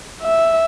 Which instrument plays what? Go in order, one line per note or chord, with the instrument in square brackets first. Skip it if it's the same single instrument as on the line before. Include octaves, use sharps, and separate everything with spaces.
[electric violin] E5